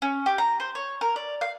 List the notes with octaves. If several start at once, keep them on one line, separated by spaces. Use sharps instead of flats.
C#4
G4
A#5
C5
C#5
A#4
D5
F5